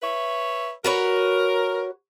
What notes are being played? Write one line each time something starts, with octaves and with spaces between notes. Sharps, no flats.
B4 C#5 E5
F#4 A#4 B4 C#5